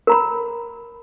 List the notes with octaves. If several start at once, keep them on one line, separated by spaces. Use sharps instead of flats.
A#4 A#5 B5